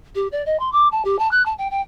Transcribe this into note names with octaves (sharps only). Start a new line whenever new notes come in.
G4
D5
D#5
C6
D6
A5
G4
A5
F#6
A5
G5
G5